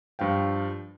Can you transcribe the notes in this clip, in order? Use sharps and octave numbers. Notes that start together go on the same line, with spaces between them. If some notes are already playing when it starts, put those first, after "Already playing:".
G2 F3 F5 G5